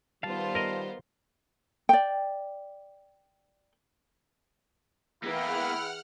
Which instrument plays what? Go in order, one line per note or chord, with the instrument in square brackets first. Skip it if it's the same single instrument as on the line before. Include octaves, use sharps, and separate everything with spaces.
[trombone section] D#3 G3 [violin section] B3 F4 C5 [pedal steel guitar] F5 A5
[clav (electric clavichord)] A#4 D#5
[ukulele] D5 G5
[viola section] E3 G#4 G5 [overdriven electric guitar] A#3 B3 [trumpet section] E4 [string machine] F#5 F6